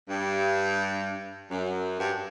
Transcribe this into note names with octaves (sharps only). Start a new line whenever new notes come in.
G2
F#2
G2